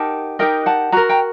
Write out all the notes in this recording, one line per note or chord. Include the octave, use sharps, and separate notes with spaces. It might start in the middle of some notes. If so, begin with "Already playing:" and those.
Already playing: D#4 G4 A#4 F#5 A5
D#4 G4 A#4 D#5 G5
F#5 A5
F#4 A#4 A#5
G5 A#5